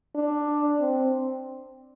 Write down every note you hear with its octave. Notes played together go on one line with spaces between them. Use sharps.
D4
C4